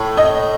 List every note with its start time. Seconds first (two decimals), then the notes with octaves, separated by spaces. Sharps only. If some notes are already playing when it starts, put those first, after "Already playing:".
Already playing: A2
0.17 D#5